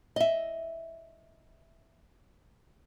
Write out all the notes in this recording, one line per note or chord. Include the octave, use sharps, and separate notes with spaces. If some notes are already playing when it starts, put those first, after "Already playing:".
D#5 E5